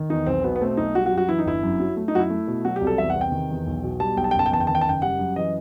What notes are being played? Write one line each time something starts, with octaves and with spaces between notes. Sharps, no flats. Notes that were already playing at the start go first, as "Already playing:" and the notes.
Already playing: D#3
E2 D#4
B1 C4
B2 B3
B3
A3 C4
B1 D#4
G3 F#4
F#4
F#2
F#4
E3 E4
D#4
G1 E4
F#2
F#3
A3
D#4
F#2 F#4
E4
A3
B2
F#3 F#4
G4
C2
A4
E2 E5
F#5
C3
G5
D#3
E2
B1
B2
G3 A5
B1 G5
A5
G5
F#1 A5
G5
E2 A5
G5
D#3 A5
G5
A5
F#1 G5
G3 F#5
F#2
E3 D#5